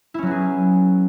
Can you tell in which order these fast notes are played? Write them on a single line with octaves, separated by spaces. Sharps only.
E4 C#4 F#3 B3 G#4